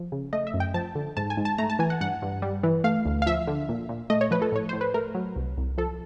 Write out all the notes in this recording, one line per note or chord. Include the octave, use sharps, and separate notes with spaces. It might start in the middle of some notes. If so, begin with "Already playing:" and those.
Already playing: F3
C#3
A3 D#5
E5
F#2
G5
F3 A5
D3
G#2 A5
G#5
G#2
A5
A3 A#5
A5
E3 G#5
F#5
G2 F#5
G2
G3
E3
A3 F5
D2
F5
F3 E5
D3
A#2
A#2
A3 D#5
C#5
F3 B4
A4
A2 C#5
A2 C5
B4
A3 A#4
F#3
C2
C2
F3 A4